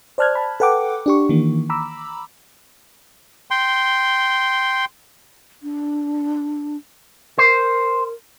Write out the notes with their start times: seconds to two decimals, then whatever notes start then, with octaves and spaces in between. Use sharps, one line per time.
0.18 C5 D5 A5 F6 F#6 G#6
0.35 A5 B5
0.60 A4 B4 F#5 G5 D6
1.06 D4 G4 C#6
1.29 D#3 E3 A#3
1.70 A#5 B5 D6 E6
3.51 G5 C6
5.63 D4
7.38 A#4 C5